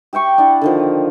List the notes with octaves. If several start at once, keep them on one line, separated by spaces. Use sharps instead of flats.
G4 E5 G5 C#6
D4 E4 D5 F#5
D3 D#3 F3